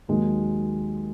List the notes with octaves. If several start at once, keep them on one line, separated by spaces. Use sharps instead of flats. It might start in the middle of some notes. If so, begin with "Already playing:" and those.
D#2 D#3 F#3 G#3